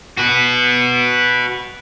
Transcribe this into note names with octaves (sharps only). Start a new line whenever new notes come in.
F#4 B4